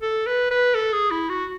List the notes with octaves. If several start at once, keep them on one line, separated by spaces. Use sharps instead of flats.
A4
B4
B4
A4
G#4
E4
F#4